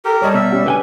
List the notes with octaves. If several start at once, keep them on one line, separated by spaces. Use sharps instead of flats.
G4 A4 A#4
G3 C#5 D#5 A5
B2 E5
C#4 G4 F#5
D3 G4 B4 G5 G#5